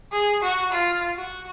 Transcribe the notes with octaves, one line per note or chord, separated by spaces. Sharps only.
G#4
F#4
F4
F#4